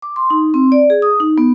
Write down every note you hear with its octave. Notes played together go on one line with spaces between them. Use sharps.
D6
C6
D#4
C4
D5
G#4
D#6
D#4
B3